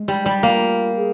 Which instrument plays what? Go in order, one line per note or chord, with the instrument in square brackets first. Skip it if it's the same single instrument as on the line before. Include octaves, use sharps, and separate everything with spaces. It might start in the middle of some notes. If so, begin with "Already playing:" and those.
Already playing: [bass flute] G#3
[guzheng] G3
G3
[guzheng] A#3 [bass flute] F4
[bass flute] G#4